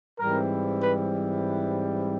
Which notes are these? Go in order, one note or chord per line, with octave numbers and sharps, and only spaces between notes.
G#2 E3 G3 C4 A#4
B4